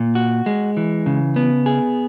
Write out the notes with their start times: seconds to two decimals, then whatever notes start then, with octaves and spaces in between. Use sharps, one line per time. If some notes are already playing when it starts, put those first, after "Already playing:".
Already playing: A#2
0.15 F#4
0.46 G#3
0.77 E3
1.06 C#3
1.36 B3
1.66 G#4